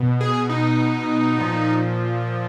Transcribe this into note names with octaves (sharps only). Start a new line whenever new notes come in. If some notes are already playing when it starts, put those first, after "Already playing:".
Already playing: B2
G#4
D#4
A#2 F3